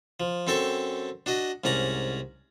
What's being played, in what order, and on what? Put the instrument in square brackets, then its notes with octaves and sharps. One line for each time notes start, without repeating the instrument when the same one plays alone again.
[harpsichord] F3
F#2 C4 A4 G5 A5 C#6
D4 F#4 D#5
C2 G#2 C#4 D5 A#5